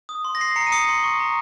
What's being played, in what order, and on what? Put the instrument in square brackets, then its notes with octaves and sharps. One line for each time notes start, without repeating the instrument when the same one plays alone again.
[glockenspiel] D#6
C6
A#6
D#6 C7
A#5 C#7
D#7
D#6 C#7
C6
C#6
A#5